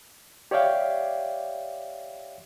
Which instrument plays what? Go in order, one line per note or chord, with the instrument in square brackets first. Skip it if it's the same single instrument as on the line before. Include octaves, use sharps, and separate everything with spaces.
[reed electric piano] G4 C#5 D5 E5 F5 G5